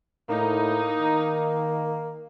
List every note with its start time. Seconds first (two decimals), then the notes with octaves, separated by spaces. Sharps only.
0.29 A2 A#3 D#4
1.01 D#3